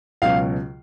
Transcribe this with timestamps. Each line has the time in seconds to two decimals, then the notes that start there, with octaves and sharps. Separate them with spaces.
0.22 C#2 B2 F#3 F5